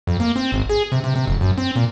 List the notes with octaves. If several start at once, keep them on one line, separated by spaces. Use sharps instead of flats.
F2
A#3
C4
G#1
G#4
C3
C3
C3
F1
F#2
C4
A#2